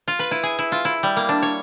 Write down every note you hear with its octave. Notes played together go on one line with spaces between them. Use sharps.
F4
B4
E4
G#4
E4
F4
E4
G3
A#3
D4
C#5